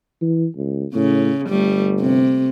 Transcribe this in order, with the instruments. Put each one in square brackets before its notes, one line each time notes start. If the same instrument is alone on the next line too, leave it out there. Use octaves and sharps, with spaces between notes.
[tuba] E3
C#2
[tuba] A2 [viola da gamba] C#3
[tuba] G1 [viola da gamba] G3 A3
[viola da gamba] C3